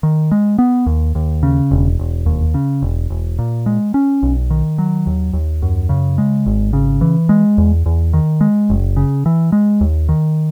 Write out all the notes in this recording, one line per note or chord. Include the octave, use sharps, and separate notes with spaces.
D#3
G#3
B3
D#2
D#2
C#3
E1
E1
D#2
C#3
E1
E1
A#2
G#3
C#4
B1
D#3
F#3
D#2
D#2
F#2
C#3
G#3
G#1
C#3
E3
G#3
E2
E2
D#3
G#3
F#1
C#3
E3
G#3
D#2
D#3